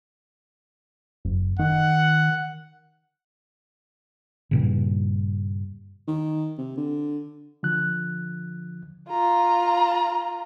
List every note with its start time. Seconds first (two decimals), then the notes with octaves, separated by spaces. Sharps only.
1.25 F#1
1.59 D#3 F#5
4.51 G2 A#2 C#3
6.08 D#3
6.58 C3
6.77 D3
7.63 D3 F3 F#6
9.10 F4 A#5